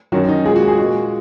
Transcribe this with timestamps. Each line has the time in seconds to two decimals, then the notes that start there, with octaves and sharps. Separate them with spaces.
0.12 F#2 D#3 F#3 F#4
0.29 D#4
0.45 A#2 G#3 G#4
0.56 F#4
0.68 G#4
0.78 A#2 G#3 F#4